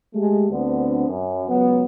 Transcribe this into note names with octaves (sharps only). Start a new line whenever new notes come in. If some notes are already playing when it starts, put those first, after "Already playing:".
G#3 A3 G4
D2 D3 B3 C4
F#2
C#2 F#3 B3